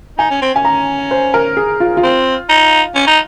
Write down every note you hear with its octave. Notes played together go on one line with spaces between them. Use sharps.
D#4 G#5
C#4
C4
C#4 G#5
A#5
C5
A#4
G#4
F4
F4
C4
D#4
C#4
D#4